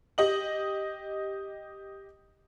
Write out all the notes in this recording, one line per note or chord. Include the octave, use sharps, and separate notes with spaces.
G4 D#5 F#7